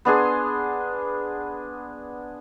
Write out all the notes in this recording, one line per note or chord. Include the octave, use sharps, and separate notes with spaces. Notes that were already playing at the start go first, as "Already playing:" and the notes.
B3 D4 G#4 C6